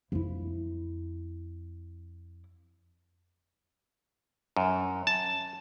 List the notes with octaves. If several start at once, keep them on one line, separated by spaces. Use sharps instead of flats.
F2 E4
F#2
A5